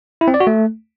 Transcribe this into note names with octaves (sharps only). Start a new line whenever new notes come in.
E4
C4
D5
F#4
A3